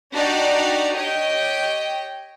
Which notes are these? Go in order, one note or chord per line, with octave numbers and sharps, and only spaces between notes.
D4 D#4 F#4 G4 D5 A#5
G4 C#5 D#5 G5